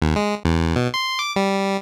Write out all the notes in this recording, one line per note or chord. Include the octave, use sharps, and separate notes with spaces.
D#2
G#3
E2
B2
C6
D6
G3